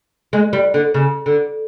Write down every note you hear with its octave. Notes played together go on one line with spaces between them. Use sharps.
G#3
G3
D3
C#3
D3